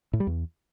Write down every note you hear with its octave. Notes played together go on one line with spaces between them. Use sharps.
A2
G3
E2